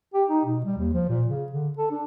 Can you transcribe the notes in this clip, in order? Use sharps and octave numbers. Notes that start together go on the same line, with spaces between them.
G4
D#4
B2
G3
D#2
F3
A#2
C#3
D3
A4
D4